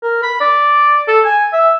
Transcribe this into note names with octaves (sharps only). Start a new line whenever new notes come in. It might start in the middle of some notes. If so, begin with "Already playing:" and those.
A#4
B5
D5
A4
G#5
E5